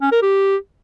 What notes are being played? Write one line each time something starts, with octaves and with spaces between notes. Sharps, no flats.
C#4
A#4
G4